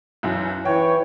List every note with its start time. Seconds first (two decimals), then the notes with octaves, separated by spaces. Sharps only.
0.23 B1 F#2 E3
0.65 E3 C#5 G5